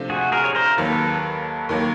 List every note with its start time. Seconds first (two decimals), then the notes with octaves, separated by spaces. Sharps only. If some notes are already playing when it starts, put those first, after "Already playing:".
Already playing: C3 F3 A3 D4
0.10 F#4 G#4
0.32 G#4 A#4
0.44 C#5
0.55 A#4 C5
0.77 D#2 D#3 F#3 A#3 A4 B4
1.69 D#2 D#3 F#3 A#3